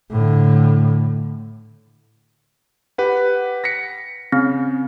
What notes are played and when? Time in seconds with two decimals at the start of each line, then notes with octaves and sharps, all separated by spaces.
0.11 A2 D3
2.98 G4 B4 F#5
3.64 A#6 B6 C#7
4.32 C#3 C4